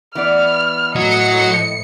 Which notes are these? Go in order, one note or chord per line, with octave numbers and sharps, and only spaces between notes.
E3 B3 D5 F6
A2 F#3 D#5 C#7